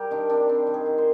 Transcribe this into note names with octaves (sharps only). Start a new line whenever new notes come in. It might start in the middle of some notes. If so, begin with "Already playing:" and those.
Already playing: G3 G4 A#4
D#3 D4
C4 D4
G3 C4
D#3
G#4
D#3
C5